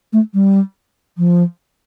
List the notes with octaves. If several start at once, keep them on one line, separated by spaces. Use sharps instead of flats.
A3
G3
F3